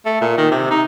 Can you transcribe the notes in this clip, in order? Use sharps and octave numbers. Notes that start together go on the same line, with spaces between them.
A3
A#2
D#3
C3
D#4